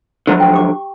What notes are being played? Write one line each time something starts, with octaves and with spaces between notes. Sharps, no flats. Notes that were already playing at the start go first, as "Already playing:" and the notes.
D3 F3 F#3
G5
G4 C#6 D6